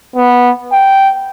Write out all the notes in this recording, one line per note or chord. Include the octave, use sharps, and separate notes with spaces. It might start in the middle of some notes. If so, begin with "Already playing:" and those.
B3
G5